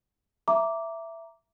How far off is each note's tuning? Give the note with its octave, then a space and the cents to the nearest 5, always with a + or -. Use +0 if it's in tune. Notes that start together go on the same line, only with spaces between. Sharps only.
E5 +10 A#5 +0 D6 -10